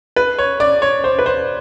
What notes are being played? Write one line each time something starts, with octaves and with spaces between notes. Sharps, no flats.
B4
C#5
D5
C#5
C5
B4
C5